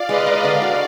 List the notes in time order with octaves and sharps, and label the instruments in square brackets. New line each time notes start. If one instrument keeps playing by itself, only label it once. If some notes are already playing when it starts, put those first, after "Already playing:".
Already playing: [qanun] F4 [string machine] D5 F5
[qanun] G#3 [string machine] B4 D#5
[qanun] A#4
[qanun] D3 [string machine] D5 F5
[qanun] F#4